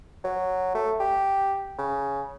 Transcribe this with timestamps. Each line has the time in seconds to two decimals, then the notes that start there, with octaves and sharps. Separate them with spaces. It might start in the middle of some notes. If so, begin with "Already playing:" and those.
0.24 F#3
0.75 A3
1.00 G4
1.79 C#3